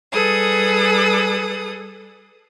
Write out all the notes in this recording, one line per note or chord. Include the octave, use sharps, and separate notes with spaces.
G3 G#4 A4 B4 D#6